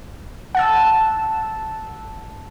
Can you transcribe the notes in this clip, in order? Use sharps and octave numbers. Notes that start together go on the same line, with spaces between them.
F#5 A5 E6